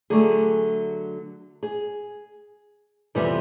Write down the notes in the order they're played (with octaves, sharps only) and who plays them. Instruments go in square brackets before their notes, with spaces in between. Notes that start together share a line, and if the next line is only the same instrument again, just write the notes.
[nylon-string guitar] D3 F#3 A3 G#4
G#4
F2 C3 E3 G3 B3